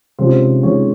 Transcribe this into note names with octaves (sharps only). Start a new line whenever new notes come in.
C3 D#3 G#3 C#4 F4 C5
C3 D#3 G#3 C#4 F4 C#5